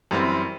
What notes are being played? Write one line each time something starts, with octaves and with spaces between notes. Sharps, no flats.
F#2 E3 G3 C4